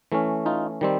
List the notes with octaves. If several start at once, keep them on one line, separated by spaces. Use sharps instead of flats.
E3 A3 C#4
D#4 F4
D#3 G3 C4